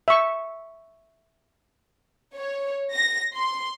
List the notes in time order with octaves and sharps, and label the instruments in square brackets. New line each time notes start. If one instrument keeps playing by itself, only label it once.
[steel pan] E5 C#6
[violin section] C#5
A#6
C6